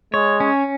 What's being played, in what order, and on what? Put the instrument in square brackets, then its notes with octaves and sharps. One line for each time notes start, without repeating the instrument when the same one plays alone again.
[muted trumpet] G#3 [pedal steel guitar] C#5
[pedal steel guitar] C#4